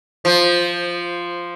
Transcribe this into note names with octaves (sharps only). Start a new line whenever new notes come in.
F3